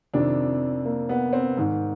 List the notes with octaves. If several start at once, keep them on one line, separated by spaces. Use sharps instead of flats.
F2 C3 D#3 D4
A#3
B3
C4
G#2 D#3